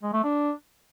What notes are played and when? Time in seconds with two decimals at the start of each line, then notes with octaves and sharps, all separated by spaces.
0.03 G#3
0.13 A3
0.24 D4